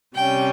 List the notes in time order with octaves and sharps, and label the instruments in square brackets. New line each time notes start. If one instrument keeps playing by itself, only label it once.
[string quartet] C3 G3 C#4 G5